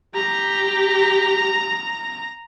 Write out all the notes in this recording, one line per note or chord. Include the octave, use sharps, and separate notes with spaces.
G4 A#5